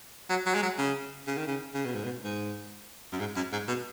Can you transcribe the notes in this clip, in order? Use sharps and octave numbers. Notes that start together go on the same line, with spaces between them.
F#3
F#3
G#3
F#3
C#3
C#3
D#3
C#3
C#3
B2
G#2
B2
G#2
F#2
G#2
F#2
G#2
B2